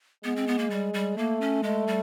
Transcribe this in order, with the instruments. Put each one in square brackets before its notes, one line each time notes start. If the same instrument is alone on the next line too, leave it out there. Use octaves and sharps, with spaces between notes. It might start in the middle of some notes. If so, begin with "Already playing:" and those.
[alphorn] G#3 [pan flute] B3
[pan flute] C4
B3
A#3
G3
G3
[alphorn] A3 [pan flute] A#3
[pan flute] C#4
[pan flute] G#3 [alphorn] A3
[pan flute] G3